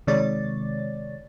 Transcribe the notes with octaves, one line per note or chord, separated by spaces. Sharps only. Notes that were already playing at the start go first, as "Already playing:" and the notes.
C3 D#3 G#3 C#5 D5 A6